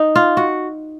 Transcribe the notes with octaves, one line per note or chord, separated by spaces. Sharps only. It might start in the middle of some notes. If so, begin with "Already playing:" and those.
Already playing: D#4
F4
F#4